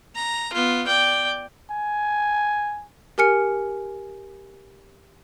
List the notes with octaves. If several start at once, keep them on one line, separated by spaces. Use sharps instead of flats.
A#5
B3 F4
D5 G5
G#5
G4 A#4 G#5 F6 C#7